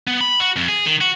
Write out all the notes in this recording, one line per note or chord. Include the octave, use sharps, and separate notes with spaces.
B3
B5
F#4
F2
G#4
D#3
F#4